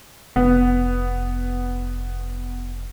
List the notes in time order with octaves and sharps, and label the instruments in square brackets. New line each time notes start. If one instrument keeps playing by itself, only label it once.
[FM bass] F1 [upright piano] B3